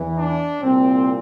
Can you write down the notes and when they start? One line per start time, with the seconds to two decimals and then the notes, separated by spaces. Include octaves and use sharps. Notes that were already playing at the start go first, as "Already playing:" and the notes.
Already playing: E2 E3
0.15 D4
0.61 C2 A#2 C4